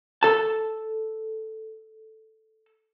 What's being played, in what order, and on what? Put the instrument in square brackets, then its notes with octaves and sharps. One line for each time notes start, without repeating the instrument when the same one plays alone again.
[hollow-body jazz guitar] A4 A5